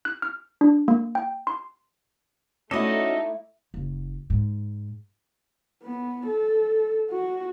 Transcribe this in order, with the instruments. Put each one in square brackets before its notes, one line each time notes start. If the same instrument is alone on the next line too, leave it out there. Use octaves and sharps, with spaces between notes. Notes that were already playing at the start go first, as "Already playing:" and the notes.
[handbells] F#6
F6
D4
A#3
G5
C6
[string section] A3 D#4 [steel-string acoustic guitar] C#4 F#4 [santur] E4 D5 [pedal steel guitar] A4 D#5
[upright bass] F#1
G#2
[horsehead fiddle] B3
A4
F#4